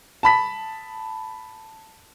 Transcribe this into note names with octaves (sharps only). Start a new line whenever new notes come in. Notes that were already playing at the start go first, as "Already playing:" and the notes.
A5 B5 B6